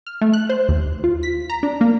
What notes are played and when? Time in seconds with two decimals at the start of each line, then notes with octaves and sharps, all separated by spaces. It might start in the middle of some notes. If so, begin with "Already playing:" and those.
0.07 F6
0.21 A3
0.33 F#6
0.49 C5
0.69 D#2
1.04 F4
1.23 B6
1.50 A#5
1.63 D4
1.81 A#3